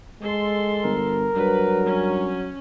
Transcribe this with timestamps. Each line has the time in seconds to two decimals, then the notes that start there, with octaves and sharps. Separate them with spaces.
0.22 G#3 A4 C6
0.84 G1 A#4
1.36 G2 F#3 B4
1.86 C#4